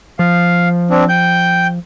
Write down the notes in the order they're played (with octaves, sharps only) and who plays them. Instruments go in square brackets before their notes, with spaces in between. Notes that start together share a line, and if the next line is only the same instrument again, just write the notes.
[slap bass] F3 [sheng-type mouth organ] F5
[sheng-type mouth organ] C4 D4
G5 G6